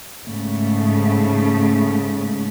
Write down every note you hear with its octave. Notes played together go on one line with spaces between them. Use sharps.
G#2 C#3 A3